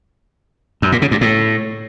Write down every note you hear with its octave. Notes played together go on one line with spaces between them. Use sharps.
F#2
A#2
C#3
G2
A2